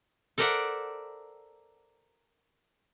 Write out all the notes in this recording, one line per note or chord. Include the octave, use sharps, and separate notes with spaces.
A4 A#4 C5 D5 E5 F#5